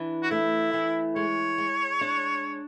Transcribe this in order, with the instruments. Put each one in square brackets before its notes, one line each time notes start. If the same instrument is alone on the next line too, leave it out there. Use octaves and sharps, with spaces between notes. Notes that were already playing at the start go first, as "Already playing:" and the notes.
Already playing: [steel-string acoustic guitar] E3 D4
[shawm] F#4
[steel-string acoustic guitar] A3 [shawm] E4
[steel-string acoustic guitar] E3
[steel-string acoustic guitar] G#3 [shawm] C#5
[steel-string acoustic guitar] G#3
D4